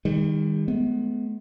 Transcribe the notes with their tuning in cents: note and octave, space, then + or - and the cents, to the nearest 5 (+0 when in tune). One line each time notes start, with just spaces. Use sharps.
D#3 +0 G3 +40
G#3 +45 B3 +5